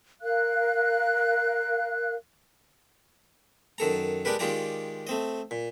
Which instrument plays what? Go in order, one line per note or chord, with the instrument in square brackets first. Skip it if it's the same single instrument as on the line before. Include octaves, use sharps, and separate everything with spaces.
[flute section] A#4 F5 F#6
[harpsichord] F#2 D#3 A4 A#5
G#3 D4 G4 A#4 B4
D#3 G#3 F4 G4 D5 A#5
A3 C4 D#5
A#2